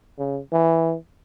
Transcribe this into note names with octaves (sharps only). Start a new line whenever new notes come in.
C#3
E3